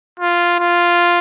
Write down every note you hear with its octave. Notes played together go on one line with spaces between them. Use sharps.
F4
F4